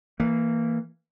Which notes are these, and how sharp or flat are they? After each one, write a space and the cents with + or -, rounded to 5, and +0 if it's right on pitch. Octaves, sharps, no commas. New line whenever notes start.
E3 +0 A#3 -15